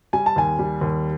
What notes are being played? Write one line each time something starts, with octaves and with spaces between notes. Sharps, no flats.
G3 G#5
A5
D#2 G#5
G3
D#2